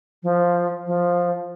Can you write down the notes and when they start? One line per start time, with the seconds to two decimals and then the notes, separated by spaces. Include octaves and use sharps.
0.23 F3
0.87 F3